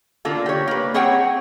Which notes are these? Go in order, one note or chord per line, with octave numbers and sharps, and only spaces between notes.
D3 A#3 D4 F4 A4
G4 C#5
A#3 B4
C4 G#4 C#5 F#5 G5